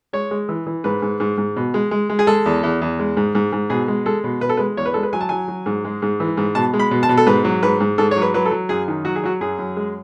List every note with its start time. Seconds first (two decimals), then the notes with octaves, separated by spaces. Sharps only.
0.13 G#3 C#5
0.31 G#3
0.49 E3
0.67 E3
0.84 G#2 B4
1.02 G#2
1.20 G#2
1.38 G#2
1.56 B2
1.74 G#3
1.91 G#3
2.10 G#3
2.19 G#4
2.27 G#3 A4
2.46 E2
2.63 E2
2.82 E2
2.99 G#3
3.17 G#2
3.35 G#2
3.53 G#2
3.70 B2 G#4
3.88 G#3
4.06 G#3 A4
4.24 B2
4.41 B2 B4
4.49 A4
4.57 G#3 B4
4.77 E2 C#5
4.86 B4
4.94 G#3 A4
5.03 B4
5.13 F#3 G#5
5.21 A5
5.29 F#3 G#5
5.48 F#3
5.66 G#2
5.84 G#3
6.02 G#2
6.20 E3
6.37 G#2
6.55 B2 A5
6.74 G#3
6.79 B5
6.91 B2
7.03 A5
7.09 B2
7.17 A4
7.26 G#2 B4
7.44 F#3
7.63 G#2 B4
7.80 G#2
7.98 G#2 A4
8.11 C#5
8.16 F#3
8.22 B4
8.34 F#3 B4
8.45 A4
8.51 F#3
8.69 F#2 G#4
8.88 D#3
9.05 F#3 F#4
9.16 G#4
9.23 F#3 F#4
9.41 F#2 G#4
9.59 F#2
9.76 G#3